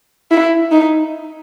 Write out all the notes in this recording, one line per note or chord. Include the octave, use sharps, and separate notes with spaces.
E4
D#4